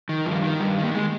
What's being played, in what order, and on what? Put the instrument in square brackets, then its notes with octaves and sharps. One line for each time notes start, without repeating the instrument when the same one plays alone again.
[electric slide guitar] D#3
G2 F3
D#3
G2 G3
D#3
A#3
G#3